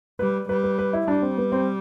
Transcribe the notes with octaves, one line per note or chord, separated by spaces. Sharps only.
G3 B4
G3 B4
B4
B4
E4
G3 D4
C4
B3
C4